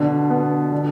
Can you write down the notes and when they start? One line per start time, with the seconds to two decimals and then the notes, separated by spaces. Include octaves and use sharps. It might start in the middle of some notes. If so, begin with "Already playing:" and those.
Already playing: B2 D3
0.30 B3
0.72 D3